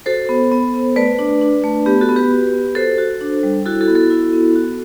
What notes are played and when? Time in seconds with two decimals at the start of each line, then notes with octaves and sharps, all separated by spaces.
0.06 F#4 A4 C5
0.29 B3
0.52 B3
0.74 B3
0.96 A3 B4 D5
1.19 D4
1.41 D4
1.64 A3
1.86 B3 G4
2.01 F#4 A4
2.09 B3
2.16 G4 B4
2.31 F#4
2.53 B3
2.75 F#4 A4 C5
2.98 F#4
3.21 D4
3.43 G3
3.66 E4 F#4 A4
3.81 F#4 A4
3.88 B3
3.95 F#4 A4
4.10 E4
4.33 B3
4.56 F#4